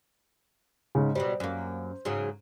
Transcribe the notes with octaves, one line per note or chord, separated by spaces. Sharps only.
G#2 C#3
B2 F#3 G3 C5
F#2 A#3
G#2 C#3 F#3